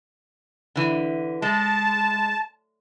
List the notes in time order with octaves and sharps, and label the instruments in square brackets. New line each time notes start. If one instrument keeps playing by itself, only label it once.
[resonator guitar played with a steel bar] D3 E3
[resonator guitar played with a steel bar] G#3 [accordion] A5